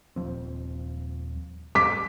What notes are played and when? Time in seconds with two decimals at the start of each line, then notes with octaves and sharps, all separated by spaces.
0.16 D#1 F3 C4
1.75 G3 D6 B6